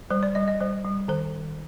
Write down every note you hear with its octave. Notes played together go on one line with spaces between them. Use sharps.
G3 C5
D5
G3 D#5
D#5
G3 C5
G3
D#3 C5